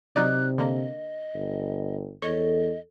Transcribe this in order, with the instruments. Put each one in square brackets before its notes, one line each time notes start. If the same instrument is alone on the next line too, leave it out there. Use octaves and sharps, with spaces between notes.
[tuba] C3 [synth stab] F#3 D#4 D5 [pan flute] F#6
[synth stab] D3 A#3 [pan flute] D#5
[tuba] G1
[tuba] E2 [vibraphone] A4 [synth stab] C#5 [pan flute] D#5